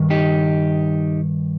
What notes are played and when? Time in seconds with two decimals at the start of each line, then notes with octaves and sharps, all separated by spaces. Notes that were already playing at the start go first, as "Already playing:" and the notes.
Already playing: G2 D#3
0.10 D#4 G4